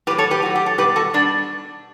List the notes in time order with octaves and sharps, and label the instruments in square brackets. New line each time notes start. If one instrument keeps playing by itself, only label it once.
[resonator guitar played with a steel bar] A2 G4 B4
F#3
A4 C#5
G4 B4
A2 F#3 F#4
G4
A4
B2 G3 G4 B4
F#4 A4
B2 G3 D4